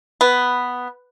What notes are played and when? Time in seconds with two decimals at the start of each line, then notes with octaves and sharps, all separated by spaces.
0.21 B3